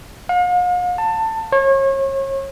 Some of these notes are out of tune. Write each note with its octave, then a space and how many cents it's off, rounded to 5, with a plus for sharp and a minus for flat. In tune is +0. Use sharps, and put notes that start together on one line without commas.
F5 +45
A5 +20
C#5 -35